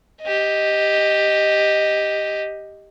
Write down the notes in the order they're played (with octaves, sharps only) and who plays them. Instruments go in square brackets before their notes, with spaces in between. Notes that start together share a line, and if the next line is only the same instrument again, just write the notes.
[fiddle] G4 D#5